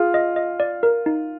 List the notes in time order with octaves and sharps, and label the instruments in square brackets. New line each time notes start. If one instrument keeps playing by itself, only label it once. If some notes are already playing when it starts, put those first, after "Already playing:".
Already playing: [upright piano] F4 [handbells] G#4
[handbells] D#5
D#5
D5
A#4
D#4